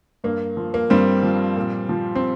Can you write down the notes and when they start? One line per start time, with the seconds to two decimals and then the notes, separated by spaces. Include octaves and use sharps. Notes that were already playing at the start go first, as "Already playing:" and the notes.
0.24 G2 A#3
0.57 F3
0.74 A#3
0.90 G2 G3 C4
1.23 F3
1.56 A#2
1.89 F3
2.15 C4